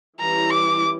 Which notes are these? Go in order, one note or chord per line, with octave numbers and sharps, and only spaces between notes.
E3 G3 C#4 E4 A#5
D6